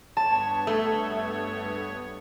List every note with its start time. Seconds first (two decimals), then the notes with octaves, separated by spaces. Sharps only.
0.17 G2 B3 C#5 A5
0.67 A3